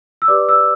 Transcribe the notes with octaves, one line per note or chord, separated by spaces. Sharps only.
E6
G4 B4 D5 D6
E6